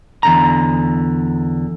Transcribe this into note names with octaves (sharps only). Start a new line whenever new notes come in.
E2 D3 A#5